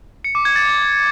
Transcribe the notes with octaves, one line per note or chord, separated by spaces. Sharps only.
C#7
D6
G#6
A6